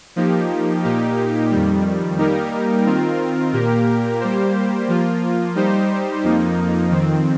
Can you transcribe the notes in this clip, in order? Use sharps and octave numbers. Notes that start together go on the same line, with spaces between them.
F3 A#3 D#4 G4
A#2 A#3 D#4 G4
F2 D#3 G3
G3 A#3 D#4 G4 A#4
D#3 C4 F4 A#4
A#2 A#3 G4 A#4
G3 A#3 G4 C5
F3 A#3 F4
G3 D#4 G4 C5
F2 F3 A#3 D#4
F2 D#3 C4